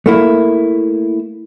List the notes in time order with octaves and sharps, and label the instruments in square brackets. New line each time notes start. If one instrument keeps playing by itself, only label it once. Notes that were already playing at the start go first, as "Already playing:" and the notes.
[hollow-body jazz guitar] A3 A#3 E4